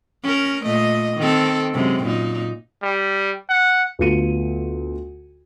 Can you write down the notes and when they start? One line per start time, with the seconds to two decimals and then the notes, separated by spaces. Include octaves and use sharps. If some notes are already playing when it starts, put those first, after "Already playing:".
0.23 C#4 A#4
0.65 A#2 A3 D#5
1.17 D#3 C4 A4
1.73 F#2 C3 G#3
2.04 A#2 D#4
2.83 G3
3.49 F#5
3.99 D2 B3 F4 C#7 D#7